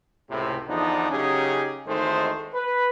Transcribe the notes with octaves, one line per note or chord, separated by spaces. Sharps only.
C#2 A2 C3
E2 D3 F3 B3 D4 D#4
C#3 F#3 C#4 D#4 G4 G#4
G#1 E2 D#3 G#3 A3 C5
B4